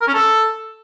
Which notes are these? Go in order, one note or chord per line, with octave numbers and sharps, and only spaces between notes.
A#4
C#4
A4